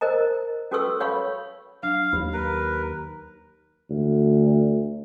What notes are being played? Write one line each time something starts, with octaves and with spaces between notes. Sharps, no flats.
A#4 C5 D#5 A#5
C#4 F#4 A4 B4 C#6 E6
C#5 F5 B5 C#6
F#3 D4 F5
D#2 B5
A#4 B4
D2